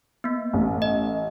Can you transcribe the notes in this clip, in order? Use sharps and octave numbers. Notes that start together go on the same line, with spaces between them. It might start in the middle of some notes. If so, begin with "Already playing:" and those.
A#3 B3
A1
D#5